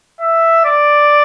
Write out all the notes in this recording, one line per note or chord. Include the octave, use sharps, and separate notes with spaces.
E5
D5